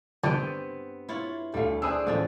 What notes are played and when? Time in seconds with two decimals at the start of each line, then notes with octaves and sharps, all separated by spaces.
0.24 G2 D3 B3 C4 G5
1.09 E4 F4 C#5
1.54 D2 G3 A3 F5
1.82 D4 G#4 B4 C5 G#5 D#6 E6
2.07 A1 D3 F3 C#4